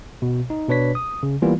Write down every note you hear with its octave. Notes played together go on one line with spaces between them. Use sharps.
B2
D#4
B2 D4 B4 C#5 B6
D#6
C#3
E3 G3 A#3 B3 F4